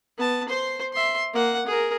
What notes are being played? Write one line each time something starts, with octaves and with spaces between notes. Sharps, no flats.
B3 A5
C5 C6
E5 C6
A#3 F#5
G#4 A#4